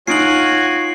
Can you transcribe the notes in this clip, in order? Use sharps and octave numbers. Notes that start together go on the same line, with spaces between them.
D#4 F4 F#4 C#5 G#5 C7 D7 F#7